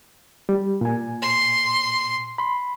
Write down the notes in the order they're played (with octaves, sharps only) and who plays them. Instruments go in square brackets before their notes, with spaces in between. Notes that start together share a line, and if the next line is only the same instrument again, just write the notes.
[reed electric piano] G3
A#2 G#5
[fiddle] C6
[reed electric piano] B5 C6